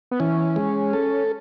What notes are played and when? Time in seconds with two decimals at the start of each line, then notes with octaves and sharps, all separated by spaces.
0.11 B3
0.20 E3 C#4
0.56 G#3
0.93 A4